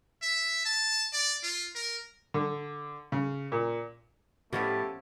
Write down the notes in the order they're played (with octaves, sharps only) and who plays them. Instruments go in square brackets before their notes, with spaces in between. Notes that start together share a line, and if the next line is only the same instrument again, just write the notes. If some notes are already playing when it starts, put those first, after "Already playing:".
[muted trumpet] E5
A5
D5
F4
A#4
[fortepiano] D3
C#3
A#2
[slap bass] A2 [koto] F3 B3 C#4 [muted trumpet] A3 [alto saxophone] G4